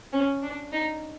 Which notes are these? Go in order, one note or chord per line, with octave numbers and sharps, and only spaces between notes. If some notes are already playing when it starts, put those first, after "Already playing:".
C#4
D4
D#4